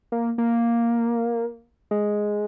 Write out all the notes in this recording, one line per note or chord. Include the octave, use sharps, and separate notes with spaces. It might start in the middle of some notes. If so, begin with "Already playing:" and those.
A#3
A#3
G#3